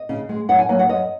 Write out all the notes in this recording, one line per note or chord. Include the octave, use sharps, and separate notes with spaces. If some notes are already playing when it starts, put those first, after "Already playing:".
Already playing: D#5
C#3
G#3
F#2 F#5
G#5
F#3 A#3 G#5
F#5
F#2 D#5